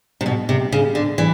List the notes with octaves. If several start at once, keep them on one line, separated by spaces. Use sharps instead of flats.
C3
B2
C3
C#3
D3
E3